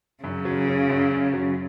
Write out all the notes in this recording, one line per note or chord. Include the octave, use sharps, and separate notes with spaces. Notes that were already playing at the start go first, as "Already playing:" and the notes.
F#2 C#3
F#3
F#3
F#2
C#4
F#3